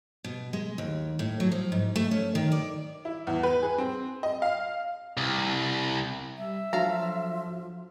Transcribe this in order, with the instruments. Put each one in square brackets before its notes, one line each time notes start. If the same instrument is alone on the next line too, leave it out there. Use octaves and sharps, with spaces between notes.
[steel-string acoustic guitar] B2
G#3
D#2
A2
F#3
F3
G#2
A3
C#4
D#3
D5
[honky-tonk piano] E4
E2
B4
G#4
C4
D#5
F5
[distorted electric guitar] C2
[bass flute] G3 [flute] E5
[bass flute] F3 [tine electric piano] F#3 D4 F#4 [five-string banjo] A4 F5 A#5